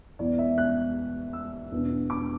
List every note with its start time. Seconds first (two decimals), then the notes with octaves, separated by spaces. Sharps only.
0.19 E2 E3 B3 D5
0.38 E5
0.58 F#6
1.33 E6
1.72 E2 B2 B3 D4
2.10 D6